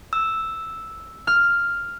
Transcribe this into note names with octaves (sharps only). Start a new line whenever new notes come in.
E6
F6